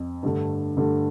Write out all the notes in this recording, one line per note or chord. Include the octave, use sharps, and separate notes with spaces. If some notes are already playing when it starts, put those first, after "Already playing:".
Already playing: F2
G2 D3 A3
G2 D3 A3